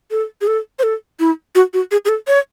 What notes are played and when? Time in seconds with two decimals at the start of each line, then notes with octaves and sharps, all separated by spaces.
0.11 A4
0.41 G#4
0.47 A4
0.79 C5
0.83 A4
1.20 E4
1.55 F#4
1.74 F#4
1.91 G#4
2.05 G#4
2.09 A4
2.27 C#5